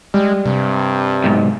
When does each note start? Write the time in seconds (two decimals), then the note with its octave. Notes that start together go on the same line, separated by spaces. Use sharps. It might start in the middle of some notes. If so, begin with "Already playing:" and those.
0.14 G3 G#3
0.46 G2 C3
1.24 B1 G#2